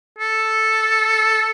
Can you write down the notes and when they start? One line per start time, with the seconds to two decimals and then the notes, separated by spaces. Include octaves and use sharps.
0.18 A4